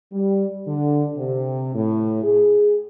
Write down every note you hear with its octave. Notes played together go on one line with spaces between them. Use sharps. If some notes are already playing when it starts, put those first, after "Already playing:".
G3
D3
C3
A2
G#4